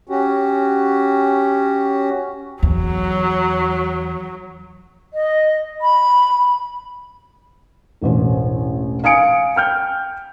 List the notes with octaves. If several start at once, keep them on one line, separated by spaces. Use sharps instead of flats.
C#4 F#4 G4
E2 F#3
D#5
B5
E1 A1 C5
F5 G#5 D#6 C#7 D7
G5 F6 G6